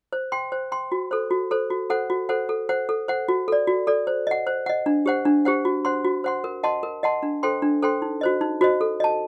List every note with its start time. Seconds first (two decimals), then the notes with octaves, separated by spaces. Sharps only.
0.13 C5
0.32 G5 C6
0.52 C5
0.72 G5 C6
0.92 F#4
1.11 A4 C5
1.31 F#4
1.51 A4 C5
1.70 F#4
1.90 A4 C5 F#5
2.10 F#4
2.29 A4 C5 F#5
2.49 A4
2.69 C5 F#5
2.89 A4
3.08 C5 F#5
3.28 F#4
3.48 A4 D5
3.67 F#4
3.87 A4 D5
4.07 C5
4.27 D#5 F#5
4.47 C5
4.66 D#5 F#5
4.86 D4
5.06 G4 C5 F#5
5.25 D4
5.45 G4 C5 F#5
5.65 F#4
5.85 C5 F#5 C6
6.05 F#4
6.24 C5 F#5 C6
6.44 A#4
6.63 D#5 F#5 A5 C6
6.83 A#4
7.03 D#5 F#5 A5 C6
7.23 D4
7.43 A4 C5 G5 C6
7.62 D4
7.82 A4 C5 G5 C6
8.02 D#4
8.21 F#4 C5 D#5
8.41 D#4
8.61 F#4 C5 D#5
8.81 A4
9.00 D#5 A5